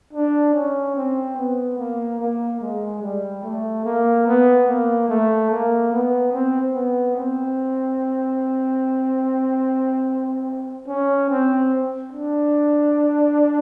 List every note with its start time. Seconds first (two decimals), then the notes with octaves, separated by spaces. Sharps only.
0.13 D4
0.54 C#4
0.96 C4
1.37 B3
1.78 A#3
2.20 A#3
2.61 G#3
3.02 G3
3.43 A3
3.85 A#3
4.27 B3
4.67 A#3
5.09 A3
5.51 A#3
5.92 B3
6.32 C4
6.74 B3
7.16 C4
10.88 C#4
11.29 C4
12.12 D4